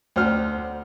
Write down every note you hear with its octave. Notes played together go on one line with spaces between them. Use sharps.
D2 C5 F6